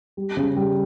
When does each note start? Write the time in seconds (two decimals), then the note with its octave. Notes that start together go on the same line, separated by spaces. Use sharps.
0.17 G3
0.37 C#3
0.57 G3